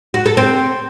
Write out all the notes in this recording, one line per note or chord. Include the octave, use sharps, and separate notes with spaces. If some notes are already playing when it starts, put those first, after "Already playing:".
F#4
A4
C4